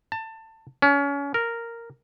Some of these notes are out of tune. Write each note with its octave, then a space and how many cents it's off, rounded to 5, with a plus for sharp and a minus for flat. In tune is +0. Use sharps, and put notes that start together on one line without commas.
A5 +20
C#4 +30
A#4 -5